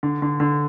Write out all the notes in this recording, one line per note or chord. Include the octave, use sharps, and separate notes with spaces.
D3
D3
D3